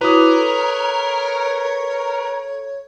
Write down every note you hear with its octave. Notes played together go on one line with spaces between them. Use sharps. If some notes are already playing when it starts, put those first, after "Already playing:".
E4 F#4 A#4 B4 C#5 D6 D#6
A4